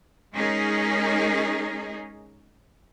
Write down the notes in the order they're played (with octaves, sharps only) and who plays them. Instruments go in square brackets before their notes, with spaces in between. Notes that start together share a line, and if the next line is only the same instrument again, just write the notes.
[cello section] G#3 C#4 D#4 G#4 A#4